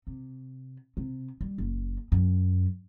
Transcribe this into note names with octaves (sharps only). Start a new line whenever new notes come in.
C3
C3
G3
F#1
F#2